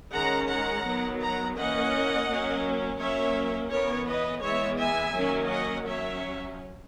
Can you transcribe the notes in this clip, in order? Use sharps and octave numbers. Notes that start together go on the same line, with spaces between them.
D#3 G#3 C#4 F#5 A#5
F#5 A#5
D#3 F#3 B3
F#5 A#5
E3 A#3 C#4 D#5 F#5
F#3 A#3 C#4
F#3 A#3 C#4 C#5 E5
E3 B3 A#4 C#5
B4 D#5
E3 G#3 B3 C#5 E5
E5 G#5
D#3 F#3 A#3 C#4
D#5 F#5
F#3 C#4 C#5 E5